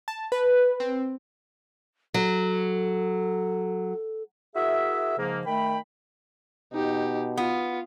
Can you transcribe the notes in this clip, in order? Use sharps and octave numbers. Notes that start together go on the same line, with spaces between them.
A5
B4
C4
F#3 A4
E4 F#4 G#4 A#4 E5
G#2 C#3 F3 A#3
D#3 A3 G5 B5
B2 D#4 G4
B3 F4